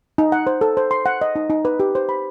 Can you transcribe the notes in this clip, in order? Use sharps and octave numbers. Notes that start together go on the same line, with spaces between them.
D#4
F#5
C5
A4
C5
C6
F#5
D#5
D#4
D#4
B4
G4
C5
B5